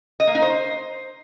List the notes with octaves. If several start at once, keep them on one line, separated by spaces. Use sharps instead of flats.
D#5
A#3
D#4
C5